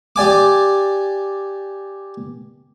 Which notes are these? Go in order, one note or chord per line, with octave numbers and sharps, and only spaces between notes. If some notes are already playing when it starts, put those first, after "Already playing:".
G4 D5 G#5 D6